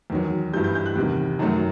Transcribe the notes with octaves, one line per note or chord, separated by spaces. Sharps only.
E2 D#3 F#3
G2 E3 G3 G6
G6
G6
F#6
E2 C3 D#3
F#2 D#3 F#3 A3